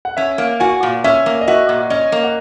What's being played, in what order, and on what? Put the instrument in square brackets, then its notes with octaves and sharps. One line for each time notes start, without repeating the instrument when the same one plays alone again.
[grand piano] F#5
[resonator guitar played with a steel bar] C#4 [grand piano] E5
[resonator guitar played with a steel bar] A#3
[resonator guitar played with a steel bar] F#4 [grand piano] G#5
[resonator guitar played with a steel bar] A#2
[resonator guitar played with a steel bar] C#4 [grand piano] E5
[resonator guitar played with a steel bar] A#3
[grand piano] D#5
[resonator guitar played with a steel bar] F#4 [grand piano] E5
[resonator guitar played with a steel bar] A#2
[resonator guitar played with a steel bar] C#4 [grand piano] D#5
[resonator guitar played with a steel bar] A#3
[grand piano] F#5